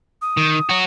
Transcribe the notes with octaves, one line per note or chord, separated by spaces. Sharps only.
D#6
D#3
F#4 C#5